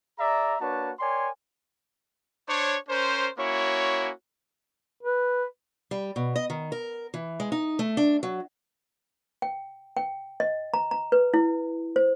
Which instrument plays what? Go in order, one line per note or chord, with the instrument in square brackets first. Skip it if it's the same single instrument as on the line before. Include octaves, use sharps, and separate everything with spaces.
[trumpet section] G#4 D5 E5 A#5
A#3 D4 F#4 B4 C#5 A5
A#4 C#5 D5 G5 G#5 C6
D4 C5 C#5
C#4 A#4 C5
A#3 C#4 E4 F#4 C#5
[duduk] B4
[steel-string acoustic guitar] G3
B2
D#5
D#3
A#4
E3
G#3
D#4
A3
D4
F#3
[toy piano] G5
G5
D#5
A#5
A#5
B4
E4
C5